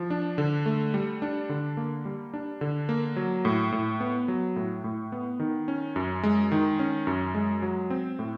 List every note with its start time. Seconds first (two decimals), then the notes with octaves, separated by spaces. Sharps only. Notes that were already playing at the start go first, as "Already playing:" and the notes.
Already playing: F3
0.10 D4
0.38 D3
0.66 A3
0.94 G3
1.22 D4
1.49 D3
1.77 A#3
2.05 G3
2.34 D4
2.61 D3
2.89 A#3
3.16 F#3
3.45 A2
3.72 A2
4.00 B3
4.28 F#3
4.56 A2
4.84 A2
5.12 B3
5.40 D#3
5.68 C#4
5.96 F#2
6.23 G#3
6.52 D#3
6.79 C#4
7.07 F#2
7.35 G#3
7.62 F#3
7.90 C4
8.19 A2